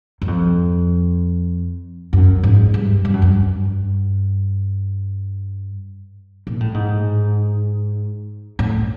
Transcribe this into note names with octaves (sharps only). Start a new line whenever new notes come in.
F#2
F2
F#2
G#2
G2
G2
F#2
G2
A#2
A2
G#2
A2